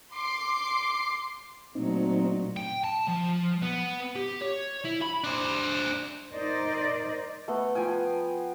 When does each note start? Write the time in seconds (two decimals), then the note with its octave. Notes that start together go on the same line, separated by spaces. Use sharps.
0.13 C6 D6 C7
1.75 A#2 F#3 A3 C4 D#4
2.57 G5
2.84 A5
3.08 F3
3.62 B3
4.15 G4
4.41 C#5
4.84 E4
5.02 B5
5.24 D4 C5
6.33 D#4 A#4 C5 D5 D#5
7.48 A3 B3
7.75 F3 G5 G#5